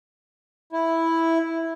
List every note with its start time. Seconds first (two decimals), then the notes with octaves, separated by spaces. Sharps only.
0.73 E4